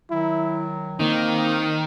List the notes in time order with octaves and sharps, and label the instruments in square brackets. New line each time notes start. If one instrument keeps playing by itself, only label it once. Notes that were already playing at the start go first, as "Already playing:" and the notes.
[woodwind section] D#3 F#3 [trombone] E4
[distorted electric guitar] D#3 [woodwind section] A#3 [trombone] C4 [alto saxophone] D#4